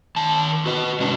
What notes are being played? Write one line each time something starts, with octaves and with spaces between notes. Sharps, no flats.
D#3 A5
F#4 B4 D#5
C3 G#3 C#4 D4